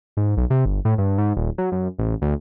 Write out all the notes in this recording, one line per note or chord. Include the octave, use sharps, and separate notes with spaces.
G#2
B1
C3
G1
A2
G2
G#2
D#1
F#3
F#2
A1
D2